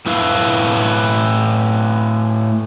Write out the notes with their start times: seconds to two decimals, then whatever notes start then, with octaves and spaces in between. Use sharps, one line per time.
0.06 A2 E4 B4 F5